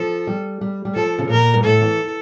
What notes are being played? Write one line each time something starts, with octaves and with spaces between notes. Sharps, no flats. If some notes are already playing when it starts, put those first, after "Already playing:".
Already playing: F3 A4
G3
G3
G3
F3 A4
C#3
A#2 A#4
G2
A2 A4
E3